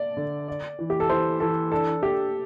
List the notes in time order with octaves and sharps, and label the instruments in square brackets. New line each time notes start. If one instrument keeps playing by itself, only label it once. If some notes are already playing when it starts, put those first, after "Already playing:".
Already playing: [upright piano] D5
[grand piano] D3
D5
E3
[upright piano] G4
A4
[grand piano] E3 [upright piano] C5
[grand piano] E3 [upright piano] A4
[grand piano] D4 [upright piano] A4
[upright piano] G4 [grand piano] A4